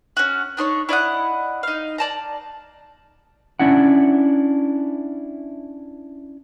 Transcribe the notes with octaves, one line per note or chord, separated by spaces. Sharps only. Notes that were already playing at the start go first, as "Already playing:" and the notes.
C#4 F#4
D4 D#4 C5 C#5
E4 D5 D#5 F#5
D#4 F5
D5 A5 A#5
C#4 D4 E4 F#5